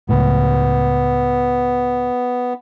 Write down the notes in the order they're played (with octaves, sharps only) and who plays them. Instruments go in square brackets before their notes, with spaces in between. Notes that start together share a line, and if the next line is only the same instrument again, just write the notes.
[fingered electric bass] C#2 A2 [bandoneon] B3